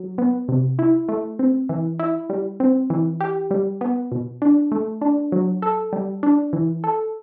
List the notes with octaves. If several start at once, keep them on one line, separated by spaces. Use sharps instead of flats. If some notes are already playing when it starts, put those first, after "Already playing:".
Already playing: F#3
B3
C3
E4
A3
C4
E3
E4
G3
C4
E3
G4
G3
B3
B2
D4
A3
D4
F#3
A4
G3
D4
E3
A4